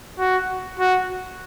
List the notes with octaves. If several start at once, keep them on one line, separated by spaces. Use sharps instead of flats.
F#4
F#4